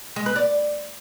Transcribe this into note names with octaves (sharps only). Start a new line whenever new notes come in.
G#3
B4
D5